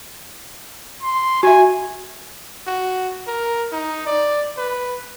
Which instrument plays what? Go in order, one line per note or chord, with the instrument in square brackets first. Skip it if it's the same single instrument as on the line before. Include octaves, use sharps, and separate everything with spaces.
[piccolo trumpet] C6
[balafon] F#4 E5 [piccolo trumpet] G#5
[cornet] F#4
A#4
D#4
D5
B4